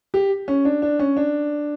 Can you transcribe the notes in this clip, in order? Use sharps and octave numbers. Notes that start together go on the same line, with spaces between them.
G4
C#4
D4
D4
C#4
D4